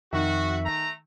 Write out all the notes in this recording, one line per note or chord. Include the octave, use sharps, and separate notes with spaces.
F2 D#3 F#4 E5
A3 A#5